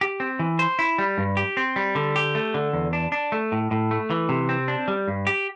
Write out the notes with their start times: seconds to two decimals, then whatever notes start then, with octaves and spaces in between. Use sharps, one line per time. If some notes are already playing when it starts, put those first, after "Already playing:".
0.01 G4
0.20 C4
0.39 E3
0.59 C5
0.79 E4
0.98 G3
1.18 G2
1.37 G4
1.57 C4
1.76 G3
1.95 D3
2.16 G4
2.35 A3
2.54 D3
2.73 E2
2.93 D4
3.12 D4
3.32 A3
3.52 A2
3.71 A2
3.91 A3
4.10 E3
4.29 C3
4.49 C4
4.68 D4
4.88 G3
5.08 G2
5.27 G4